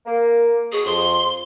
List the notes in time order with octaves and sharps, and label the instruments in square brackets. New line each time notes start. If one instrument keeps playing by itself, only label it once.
[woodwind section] A#3
[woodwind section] B2 C#6 D#6 [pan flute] G#4
[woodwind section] F2 [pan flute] C6